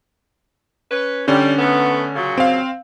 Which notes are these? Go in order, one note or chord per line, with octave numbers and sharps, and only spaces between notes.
C#4 B4
D3 G3 C#4
A3 B3
A#2 C#3 F#3
C4 F5